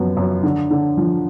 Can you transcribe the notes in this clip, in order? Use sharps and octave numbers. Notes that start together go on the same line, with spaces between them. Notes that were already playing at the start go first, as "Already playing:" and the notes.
Already playing: F#2 F3 B3
F#2
D3
D3
F3